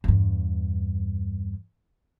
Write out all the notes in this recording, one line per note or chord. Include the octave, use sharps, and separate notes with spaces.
E2 G2